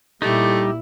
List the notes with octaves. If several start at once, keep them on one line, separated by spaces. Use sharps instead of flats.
A#2 G3 A3 D#4 E4 G4